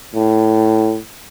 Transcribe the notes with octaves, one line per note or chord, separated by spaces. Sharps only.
A2